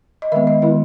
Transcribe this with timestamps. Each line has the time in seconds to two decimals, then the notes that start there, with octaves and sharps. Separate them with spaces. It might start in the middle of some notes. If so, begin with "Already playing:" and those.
0.22 D#5
0.32 D#3 G#3 B3 E5
0.47 D#5
0.62 D#3 G#3 B3 E4